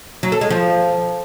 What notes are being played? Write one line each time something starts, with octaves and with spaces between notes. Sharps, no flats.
F#3
A4
G#3
F3